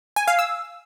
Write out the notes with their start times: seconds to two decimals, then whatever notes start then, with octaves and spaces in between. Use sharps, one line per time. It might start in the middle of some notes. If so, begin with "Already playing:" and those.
0.16 G#5
0.28 F5
0.39 E6